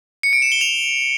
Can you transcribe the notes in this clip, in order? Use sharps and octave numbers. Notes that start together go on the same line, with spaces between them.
C#7
D7
E7
G7
F7